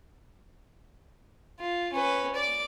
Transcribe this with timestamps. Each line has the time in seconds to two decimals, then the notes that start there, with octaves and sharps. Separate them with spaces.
1.60 F4
1.93 C#4 B4
2.35 D5 D6